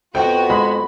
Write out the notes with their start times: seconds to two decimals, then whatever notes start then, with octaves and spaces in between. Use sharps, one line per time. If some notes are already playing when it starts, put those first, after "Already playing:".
0.15 F2 B3 F#4 G5
0.50 G#3 B5